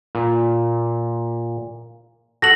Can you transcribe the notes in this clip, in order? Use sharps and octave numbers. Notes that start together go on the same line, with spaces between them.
A#2
F#4 A4 A#6 F#7